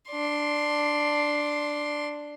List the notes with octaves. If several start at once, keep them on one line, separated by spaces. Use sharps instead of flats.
D4 C6